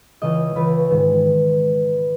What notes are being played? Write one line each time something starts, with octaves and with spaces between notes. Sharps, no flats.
C#2 C#3 E3 D#5
C#2 C#3 E3 B4
G#2 D#3